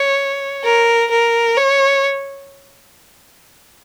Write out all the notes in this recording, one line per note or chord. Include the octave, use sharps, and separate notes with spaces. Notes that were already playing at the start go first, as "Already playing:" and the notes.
Already playing: C#5
A#4
A#4
C#5